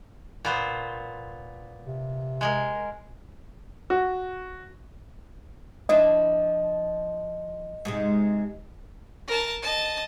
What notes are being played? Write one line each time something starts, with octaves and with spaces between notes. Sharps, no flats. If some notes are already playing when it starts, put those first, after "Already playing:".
A#2 B3 C5
C3
G#3 G#4 A#4
F#4
F3 D4 E4 D#5
G#2 C3 G#3
A#4 A5
D#5 A5